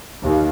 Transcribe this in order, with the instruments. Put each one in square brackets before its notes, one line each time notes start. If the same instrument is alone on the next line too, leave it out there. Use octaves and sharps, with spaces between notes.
[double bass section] D#2